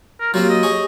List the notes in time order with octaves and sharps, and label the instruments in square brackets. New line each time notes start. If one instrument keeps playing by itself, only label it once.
[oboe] A#4
[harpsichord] F#3 A#3 C4 [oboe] F4 [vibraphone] G4
[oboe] D#5
[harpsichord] G#4 C#5